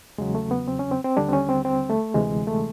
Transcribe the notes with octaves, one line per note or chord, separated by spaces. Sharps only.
E2 C#3 F#3 G#3
A3
B3
C4
C#4
C4
C4
D#2 D3 G3 D4
C4
C#4
C4
C4
A3
D2 C3 E3 G#3
A3